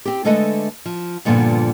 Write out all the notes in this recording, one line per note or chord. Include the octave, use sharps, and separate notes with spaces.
C4 G4
D3 G#3 A3 A4 B4 D#5
F3
G2 A#2 D3 F3 B3